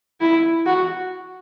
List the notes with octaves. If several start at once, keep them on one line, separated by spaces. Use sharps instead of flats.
E4
F#4